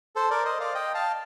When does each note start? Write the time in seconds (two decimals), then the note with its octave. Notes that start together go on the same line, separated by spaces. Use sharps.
0.16 A4 C5
0.30 A#4 D5
0.45 C5 D#5
0.60 D5 F5
0.75 D#5 G5
0.94 F5 A5